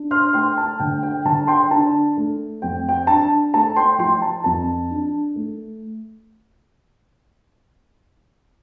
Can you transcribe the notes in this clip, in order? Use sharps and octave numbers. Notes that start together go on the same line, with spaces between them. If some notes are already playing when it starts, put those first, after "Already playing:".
Already playing: D4
C6 F6
A3 G5 C6
A5
D3 G5
G5
D3 A5
G5 C6
D4 A5
A3
F2 G5
G5
D4 A5
A3 A5
G5 C6
F3 G5 C6
A5
F2 A5
D4
A3